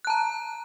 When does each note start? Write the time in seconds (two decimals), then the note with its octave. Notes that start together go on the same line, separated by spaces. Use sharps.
0.05 F#6
0.07 A5
0.10 A#5